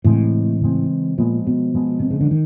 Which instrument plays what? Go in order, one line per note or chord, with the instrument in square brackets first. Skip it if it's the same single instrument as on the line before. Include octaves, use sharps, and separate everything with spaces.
[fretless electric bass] A2 [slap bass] C#3 E3 G#3 C4
[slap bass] C#3 E3 G#3 C4
[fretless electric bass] A#2 [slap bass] F3 G#3 B3
[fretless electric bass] B2
[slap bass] F3 G#3 B3
[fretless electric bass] C3
C#3
D3
D#3